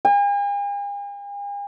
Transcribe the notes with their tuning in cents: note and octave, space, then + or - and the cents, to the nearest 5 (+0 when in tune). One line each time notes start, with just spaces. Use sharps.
G#5 -45